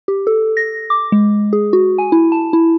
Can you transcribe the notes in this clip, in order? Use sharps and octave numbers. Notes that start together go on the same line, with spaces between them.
G4
A4
A#6
D6
G#3
G#4
F#4
G#5
E4
A5
E4